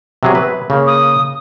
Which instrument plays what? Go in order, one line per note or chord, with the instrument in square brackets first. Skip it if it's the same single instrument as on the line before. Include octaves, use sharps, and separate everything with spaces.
[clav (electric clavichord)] C3 F#3 G#4
B4
C#3 A#3
[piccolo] D#6